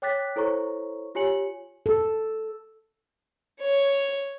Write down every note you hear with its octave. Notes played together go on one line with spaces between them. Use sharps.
C#5 G5 D6 F#6 A6 B6
E4 A4 C5 C#5 A#5 C#6
F4 G4 C#5 G#5 C#7 F#7
A4
C#5